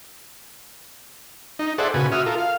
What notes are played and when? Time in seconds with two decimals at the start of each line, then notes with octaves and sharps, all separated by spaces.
1.59 D#4
1.78 G#4 A4 C5 D5 E5 F#5
1.94 A#2 C#3 F#4 B4 G#5
2.12 F#4 E5 D#6 F6
2.26 F4 A4 A#4
2.38 F5